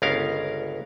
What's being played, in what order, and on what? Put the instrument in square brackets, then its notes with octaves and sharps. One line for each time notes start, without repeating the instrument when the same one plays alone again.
[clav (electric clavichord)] G1 C#2 B3 C#4 A#4 F5